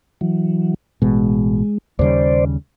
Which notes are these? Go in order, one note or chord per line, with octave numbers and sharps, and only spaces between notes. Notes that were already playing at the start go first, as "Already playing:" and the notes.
E3 F#3
A1 B2 G#3
D#2 C#3 G3 C5 D5